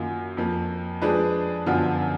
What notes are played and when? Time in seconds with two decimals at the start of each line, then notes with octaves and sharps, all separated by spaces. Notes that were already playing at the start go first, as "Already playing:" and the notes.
Already playing: F#2 D#3 A#3 F4
0.37 F2 F3 A#3
1.02 F3 G#3 D4 G#4 B4
1.66 F#2 D3 F3 B3 F4